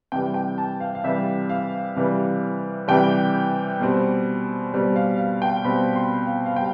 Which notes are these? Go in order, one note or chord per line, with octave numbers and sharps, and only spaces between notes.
C3 E3 G3 G5
G5
A5
F5
F5
C3 E3 G3 E5
F5
C3 E3 G3
C3 E3 G3 G5
B2 G3 C4
B2 G3 C4
F5
F5
G5
B2 G3 C4 B5
C6
F5
F5
B2 G3 G5